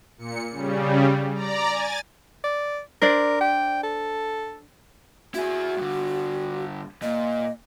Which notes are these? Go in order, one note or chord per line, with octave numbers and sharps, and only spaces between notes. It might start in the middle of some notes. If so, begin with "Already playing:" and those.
A#2 C#7
C#3 G3
D5 A#5
G#5 A6
D5
D4 A#4 C5 D5
G5
A4
E4 F#4 G#4
G2 D3
A#2 D#5